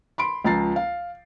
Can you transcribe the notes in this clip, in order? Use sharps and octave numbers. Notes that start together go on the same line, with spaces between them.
B5 C6 D7
C#2 F3 A#5 A6 C7
F5